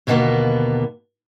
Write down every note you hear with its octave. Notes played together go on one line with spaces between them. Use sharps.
D#2 B2 D3 G3 A#3 B3